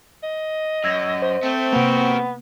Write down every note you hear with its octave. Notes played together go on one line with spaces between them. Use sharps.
D#5
F#2 E6 G#6 A#6
C5
A3 C4
C3 A#3 B3 F#4 A#4